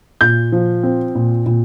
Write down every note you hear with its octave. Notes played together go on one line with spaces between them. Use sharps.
A#2 G6
F3
C4
A#2
A#2